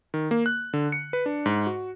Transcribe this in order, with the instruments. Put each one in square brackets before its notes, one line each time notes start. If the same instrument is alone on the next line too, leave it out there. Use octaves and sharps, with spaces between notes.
[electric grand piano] D#3
A#3
F#6
D3
C#7
B4
D4
G#2
F#4